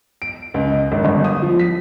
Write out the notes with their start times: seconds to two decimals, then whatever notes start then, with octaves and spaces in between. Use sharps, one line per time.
0.22 D7
0.54 C#2
0.72 D#5
0.92 G#1
1.04 G1
1.25 D#6
1.42 F3
1.59 B6